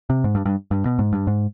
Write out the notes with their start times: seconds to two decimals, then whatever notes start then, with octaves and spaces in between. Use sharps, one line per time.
0.10 C3
0.24 G#2
0.35 G2
0.45 G2
0.71 G2
0.85 B2
0.99 G#2
1.13 G2
1.27 G#2